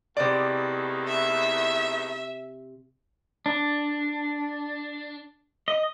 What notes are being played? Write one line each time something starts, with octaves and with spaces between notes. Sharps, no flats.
E2 A2 C3 D#3 D5 D6
E5
D4
D#5